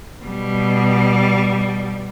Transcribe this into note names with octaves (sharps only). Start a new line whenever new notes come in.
B2 G3